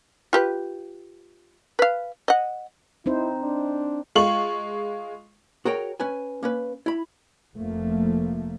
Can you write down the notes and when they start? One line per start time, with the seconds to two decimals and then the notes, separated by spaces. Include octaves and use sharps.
0.33 F4 G4 B4
1.79 B4 F5
2.28 D#5 F#5
3.06 C4 D#4 E4 C5
3.43 D4
4.15 G#3 F4 C#6 F#7
5.65 F#4 G#4 A#4 C#5 G5
6.00 C#4 B4 G#5
6.43 A#3 C#4 B4
6.86 E4 B5
7.55 F1 F3 A3 A#3